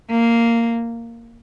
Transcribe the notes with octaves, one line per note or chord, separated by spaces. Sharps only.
A#3